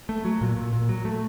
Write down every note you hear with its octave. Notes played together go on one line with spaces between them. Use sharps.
A3
F#3
A#2
A#2
A#2
F#3
A3